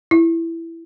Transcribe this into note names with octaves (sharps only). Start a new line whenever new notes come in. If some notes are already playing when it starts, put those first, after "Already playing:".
E4